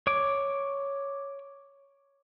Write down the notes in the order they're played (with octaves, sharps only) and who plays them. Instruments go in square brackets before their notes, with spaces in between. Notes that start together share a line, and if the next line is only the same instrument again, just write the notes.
[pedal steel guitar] C#5 D6